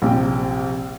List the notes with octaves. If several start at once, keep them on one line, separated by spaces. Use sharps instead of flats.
A#1 C3 G5